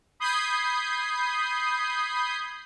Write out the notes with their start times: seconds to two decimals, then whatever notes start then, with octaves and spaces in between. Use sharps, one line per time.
0.20 B5 D#6 G6 G#6 C7